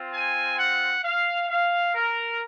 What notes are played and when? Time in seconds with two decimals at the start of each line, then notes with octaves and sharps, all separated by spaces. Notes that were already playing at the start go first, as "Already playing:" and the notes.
Already playing: C4 F4
0.13 G#5
0.59 F#5
1.03 F5
1.49 F5
1.95 A#4